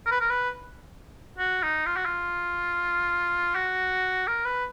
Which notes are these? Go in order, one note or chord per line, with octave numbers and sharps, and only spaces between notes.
A#4
B4
A#4
B4
F#4
D#4
F4
F#4
F4
F#4
A#4
B4